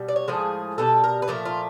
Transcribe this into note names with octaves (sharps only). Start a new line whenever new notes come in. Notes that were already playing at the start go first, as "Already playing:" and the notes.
Already playing: B2 G3
D5
C#5
A2 F3 G#3 G#4
B2 G3 A4
A#4
B4
A#2 F3 A3 A#4
F4